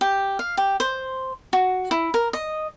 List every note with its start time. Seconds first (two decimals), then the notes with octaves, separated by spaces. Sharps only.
0.01 G4
0.39 F5
0.57 G4
0.80 C5
1.53 F#4
1.91 E4
2.14 A#4
2.33 D#5